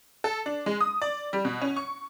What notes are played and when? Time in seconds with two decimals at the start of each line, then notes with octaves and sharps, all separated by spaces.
0.24 A4
0.46 D4
0.66 G#3
0.81 D#6
1.02 D5
1.33 G3
1.45 B2
1.61 C#4
1.76 C#6